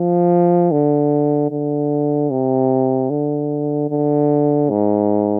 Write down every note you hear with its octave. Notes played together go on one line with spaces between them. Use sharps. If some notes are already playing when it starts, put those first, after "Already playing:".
Already playing: F3
D3
D3
C3
D3
D3
G#2